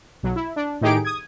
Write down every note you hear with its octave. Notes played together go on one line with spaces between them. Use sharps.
B1 F#3
E4
D4
A2 D#3 D#4 G4 G#4 D7
D#6 G#6